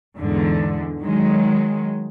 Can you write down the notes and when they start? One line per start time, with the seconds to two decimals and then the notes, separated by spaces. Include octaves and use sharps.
0.17 E2 G#2 D3
1.00 D#3 F#3 G#3